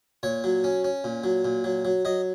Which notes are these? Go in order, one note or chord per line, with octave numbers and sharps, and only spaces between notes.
A#2 C#5
F#3
C#4
C#4
A#2
F#3
A#2
F#3
F#3
F#3 D#5